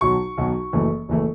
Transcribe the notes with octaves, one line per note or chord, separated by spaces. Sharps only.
B1 B2 F#3 C#6
B1 B2 F#3
F#1 F#2 E3 A3
F#1 E3 A3